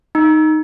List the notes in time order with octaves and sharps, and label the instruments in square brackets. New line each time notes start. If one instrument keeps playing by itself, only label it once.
[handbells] D#4